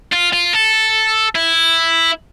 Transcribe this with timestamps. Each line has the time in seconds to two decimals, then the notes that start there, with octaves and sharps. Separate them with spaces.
0.13 F4
0.33 F4
0.54 A4
1.36 E4